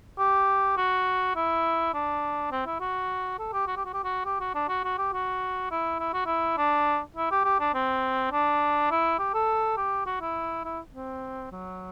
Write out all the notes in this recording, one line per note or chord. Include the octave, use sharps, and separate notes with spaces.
G4
F#4
E4
D4
C4
E4
F#4
A4
G4
F#4
G4
F#4
G4
F#4
G4
F#4
D4
F#4
F#4
G4
F#4
E4
E4
F#4
E4
D4
E4
G4
G4
D4
C4
D4
E4
G4
A4
G4
F#4
E4
E4
C4
F#3